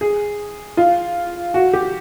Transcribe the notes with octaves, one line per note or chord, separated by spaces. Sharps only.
G#4
F4
F#4
G4